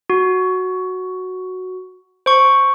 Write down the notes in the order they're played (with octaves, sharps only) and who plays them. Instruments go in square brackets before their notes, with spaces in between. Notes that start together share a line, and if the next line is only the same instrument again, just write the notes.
[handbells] F#4
C5 C#6